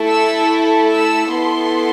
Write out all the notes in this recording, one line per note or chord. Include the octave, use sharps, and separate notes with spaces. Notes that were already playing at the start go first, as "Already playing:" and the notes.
Already playing: A3 E4 A4
E6
E6
B3 E4 A4 C6